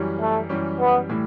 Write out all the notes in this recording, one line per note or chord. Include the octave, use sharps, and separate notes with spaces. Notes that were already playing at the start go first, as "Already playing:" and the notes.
Already playing: F#2 E3 G3 C#4 G4
A3
F#2 E3 G3 C#4 G4
B3
A2 E3 G3